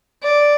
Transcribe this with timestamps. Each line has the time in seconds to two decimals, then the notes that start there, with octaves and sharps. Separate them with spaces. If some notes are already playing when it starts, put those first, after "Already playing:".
0.23 D5